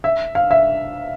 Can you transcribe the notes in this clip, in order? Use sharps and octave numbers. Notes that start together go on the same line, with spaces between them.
E5
F5
E5